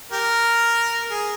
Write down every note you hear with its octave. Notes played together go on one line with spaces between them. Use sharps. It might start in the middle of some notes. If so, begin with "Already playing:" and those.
G4 A#4
G#4